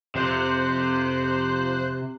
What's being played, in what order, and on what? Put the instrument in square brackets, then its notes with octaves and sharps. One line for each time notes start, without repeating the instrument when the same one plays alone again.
[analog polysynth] F2 C5 F#6 [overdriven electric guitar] C3